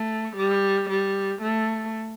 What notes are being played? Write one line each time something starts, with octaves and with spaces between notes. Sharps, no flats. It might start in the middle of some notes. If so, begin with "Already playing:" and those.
Already playing: A3
G3
G3
A3